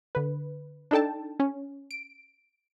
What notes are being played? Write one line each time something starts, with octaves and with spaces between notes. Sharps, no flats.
D3 B4
D4 D#4 A4 G5 A5
C#4
D7